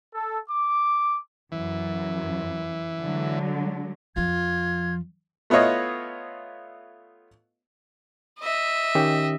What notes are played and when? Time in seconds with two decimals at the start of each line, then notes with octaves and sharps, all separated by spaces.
0.13 A4
0.49 D6
1.52 F#2 E3
3.01 D3 F#3 G#3
4.16 F2 F3 F4 G#6
5.50 A3 B3 E4 F4 C#5 D#5
8.40 D#5 E5
8.95 D#3 C#4 G4